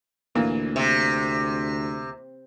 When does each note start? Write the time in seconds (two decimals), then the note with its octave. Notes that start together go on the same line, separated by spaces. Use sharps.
0.35 D2 A#2 E3 A#3
0.76 C3